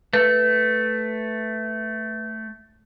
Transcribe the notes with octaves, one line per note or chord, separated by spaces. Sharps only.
A3 B4